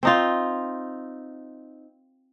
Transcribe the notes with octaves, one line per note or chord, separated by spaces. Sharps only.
C4 D#4 F4